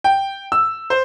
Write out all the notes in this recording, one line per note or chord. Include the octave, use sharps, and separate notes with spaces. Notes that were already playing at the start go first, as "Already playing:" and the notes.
G5
E6
C5